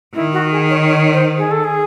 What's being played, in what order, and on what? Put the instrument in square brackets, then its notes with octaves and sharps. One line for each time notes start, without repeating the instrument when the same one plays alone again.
[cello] D#3 [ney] E4
[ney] F#4
G#4
C#5
C#5
C5
G#4
A4
G#4